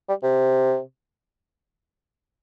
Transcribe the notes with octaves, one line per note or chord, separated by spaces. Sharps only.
G3
C3